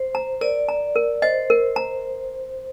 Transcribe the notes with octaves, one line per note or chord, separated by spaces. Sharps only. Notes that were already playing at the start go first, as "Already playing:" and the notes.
Already playing: C5
A#5
A#4 D5
A#5
A#4
C5 D#5
A#4
A#5